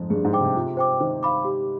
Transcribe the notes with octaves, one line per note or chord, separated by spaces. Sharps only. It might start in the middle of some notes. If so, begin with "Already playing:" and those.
Already playing: F2 G#2
G2 G#4
G#2
C5 G5 D6
C3
F4
C5 G5 D6
D#3 C5
F5 B5 D6
G4